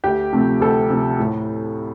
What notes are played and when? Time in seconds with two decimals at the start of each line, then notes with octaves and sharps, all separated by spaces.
0.04 D2 G4
0.32 C3 F3 A3 C4
0.61 D2 A4
0.90 C3 F3 A3 C4
1.19 A2